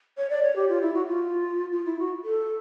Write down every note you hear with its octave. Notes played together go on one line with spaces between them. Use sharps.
C#5
D5
C#5
G4
F4
E4
F#4
F4
F4
E4
F#4
A4